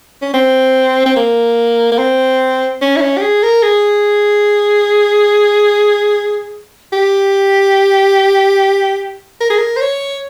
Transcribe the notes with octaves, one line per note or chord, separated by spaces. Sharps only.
C#4
C4
C4
A#3
A#3
C4
C#4
E4
C#4
G4
G#4
A#4
G#4
G4
A#4
G#4
A#4
C5
C#5